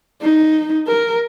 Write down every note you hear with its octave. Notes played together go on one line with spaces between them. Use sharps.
D#4
A#4